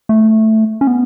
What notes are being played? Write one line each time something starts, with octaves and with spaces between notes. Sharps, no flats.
A3
C#4
B3